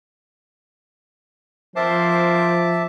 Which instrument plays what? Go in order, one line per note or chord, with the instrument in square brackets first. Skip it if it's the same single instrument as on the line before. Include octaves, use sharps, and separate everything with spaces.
[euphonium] F3 [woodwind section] C4 A#4 C5 [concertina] E5 A5 D6